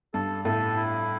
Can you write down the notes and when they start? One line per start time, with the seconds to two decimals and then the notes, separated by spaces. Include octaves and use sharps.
0.14 G2 A4
0.45 A2 A4
0.76 E4